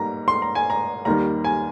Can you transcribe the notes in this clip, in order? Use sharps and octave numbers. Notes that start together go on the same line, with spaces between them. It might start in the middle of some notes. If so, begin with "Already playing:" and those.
Already playing: G#2 G3 A#3 A#5
C6
A#5
G#5
A#5
D#2 D#3 G3 A#5
G#5